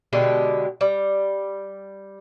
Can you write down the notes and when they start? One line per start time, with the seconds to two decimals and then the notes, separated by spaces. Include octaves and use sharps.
0.13 B2 D3 G#3 G4
0.81 G3